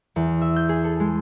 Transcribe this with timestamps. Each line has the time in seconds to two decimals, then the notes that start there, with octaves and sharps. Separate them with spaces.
0.16 E2
0.41 E5
0.56 G6
0.69 G#4
0.84 A4
1.00 G#3